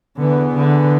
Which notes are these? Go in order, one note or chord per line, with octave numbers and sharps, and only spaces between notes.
E2 D3 E3 B3
D3